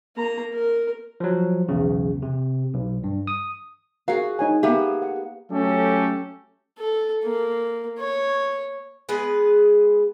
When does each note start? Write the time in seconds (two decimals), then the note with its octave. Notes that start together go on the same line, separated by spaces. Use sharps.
0.17 A#3 A#5
0.54 A#4
1.20 F3 F#3
1.68 B1 E2 C#3
2.22 C3
2.74 B1
3.04 G2
3.27 D#6
4.08 F#4 G#4 A#4 F5
4.39 D#4 C#5 G#5
4.63 A#3 B3 G4 G#4 E5
5.02 F#5
5.51 F#3 A3 C#4 G4 A4
6.78 A4
7.24 A#3
7.99 C#5
9.09 G#3 B3 G#4 B4